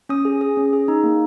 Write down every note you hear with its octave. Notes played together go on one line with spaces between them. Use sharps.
C#4 D#6
G#4
G#4
C#4
G#4
D#4
A#3